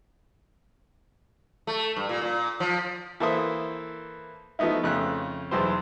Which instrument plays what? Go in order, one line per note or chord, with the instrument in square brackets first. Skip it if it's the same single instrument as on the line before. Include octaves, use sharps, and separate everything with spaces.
[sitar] A3
G2
A#2
A#2
F3
[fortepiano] E3 A#3 A4 C5 E5 D#6
F3 A3 B3 D#4 E4
F2 C#3 A3 F#6
B1 E2 E3 C5